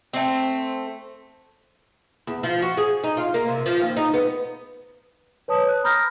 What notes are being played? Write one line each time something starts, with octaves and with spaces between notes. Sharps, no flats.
A3 C4
E2
F3
F#4
G#4
D#4
F4
A#3
C3
F3
D#2
D#4
B3
B4 C#5 A5 D#6
F#6
A#5 B5 D#6 F6 G6 A#6